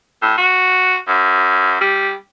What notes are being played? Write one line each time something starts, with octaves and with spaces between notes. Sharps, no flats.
A2
F#4
F#2
G3